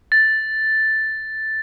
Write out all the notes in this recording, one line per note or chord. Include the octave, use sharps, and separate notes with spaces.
A6